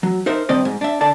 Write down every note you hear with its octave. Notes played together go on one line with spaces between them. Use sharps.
F#3
D#4 A#4 C5 E5
G2 D#3 C4 D5 D#5
G#2
D4 E5
D3 D5 A5